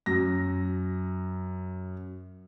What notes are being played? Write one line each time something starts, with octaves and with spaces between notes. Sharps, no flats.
F#2 A#6